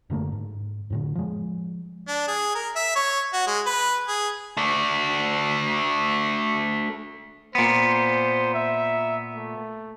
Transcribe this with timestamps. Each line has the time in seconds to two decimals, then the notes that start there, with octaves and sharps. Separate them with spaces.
0.10 F#1 D3 A3 A#3
0.32 G#2
0.90 F2 A2 D3
1.15 F3 G#3
2.08 D4
2.28 G#4
2.55 A#4
2.76 E5
2.96 C#5
3.33 F#4
3.47 G#3
3.66 B4
4.08 G#4
4.57 A3 D4
7.55 A#2 B3 C5
8.54 E5
9.35 A3